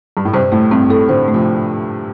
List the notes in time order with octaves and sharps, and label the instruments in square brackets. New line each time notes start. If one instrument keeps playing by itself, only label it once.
[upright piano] G2
A2
[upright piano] G2 C3 [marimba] C5
[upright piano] A2 [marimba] A3
[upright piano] G2 [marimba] C4
[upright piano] A2 [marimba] A4
[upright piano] A2 D3 [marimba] C5
[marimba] A3
[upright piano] C3 F3